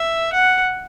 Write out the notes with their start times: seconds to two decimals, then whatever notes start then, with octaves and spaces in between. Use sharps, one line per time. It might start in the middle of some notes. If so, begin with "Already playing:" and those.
Already playing: E5
0.33 F#5